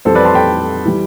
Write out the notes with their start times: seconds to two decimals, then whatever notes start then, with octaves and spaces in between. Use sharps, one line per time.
0.05 F2 E3 G3 A4 C5
0.15 B4 D5
0.25 A5 C6
0.34 G5 B5
0.85 E3 G3